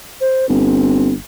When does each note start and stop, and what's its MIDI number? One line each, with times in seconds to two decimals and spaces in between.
0.21 0.48 72
0.49 1.15 31
0.49 1.12 60